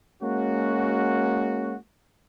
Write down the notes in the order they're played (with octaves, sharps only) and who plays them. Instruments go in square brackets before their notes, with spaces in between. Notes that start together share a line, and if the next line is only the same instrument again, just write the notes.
[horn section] G#3 A#3 C#4 F#4